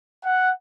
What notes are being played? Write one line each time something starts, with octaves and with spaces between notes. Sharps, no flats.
F#5